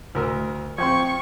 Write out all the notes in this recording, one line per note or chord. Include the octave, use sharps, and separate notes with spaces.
D2 A#4 E6
F3 C4 G5 C6 C#6 G#6